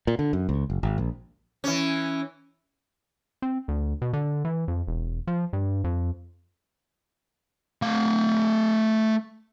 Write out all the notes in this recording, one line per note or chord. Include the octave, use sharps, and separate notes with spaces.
A#2
D3
F#2
C#2
F#1
G#1
A#1
E3 C#4
C4
D2
B2
D3
E3
F2
E1
F3
G2
F2
A3 F5